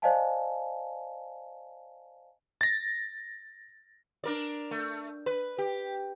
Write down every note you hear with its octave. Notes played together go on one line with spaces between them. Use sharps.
C5 D5 D#5 F5 G#5 A5
A6 A#6
D4 A#4 D5
A3
B4
G4